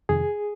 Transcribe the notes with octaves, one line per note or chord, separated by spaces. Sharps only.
F2 C3 D#3 G#4